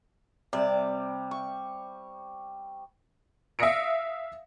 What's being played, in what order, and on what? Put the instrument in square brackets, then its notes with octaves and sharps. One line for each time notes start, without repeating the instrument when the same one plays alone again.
[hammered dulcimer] C3 G3 [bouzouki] D5
[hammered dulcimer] C#6
[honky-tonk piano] E5 F5 D#6 A#6 C#7 D7